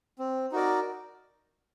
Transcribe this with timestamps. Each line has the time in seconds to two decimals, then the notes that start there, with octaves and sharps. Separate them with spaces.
0.19 C4
0.52 D#4 F#4 A#4 D5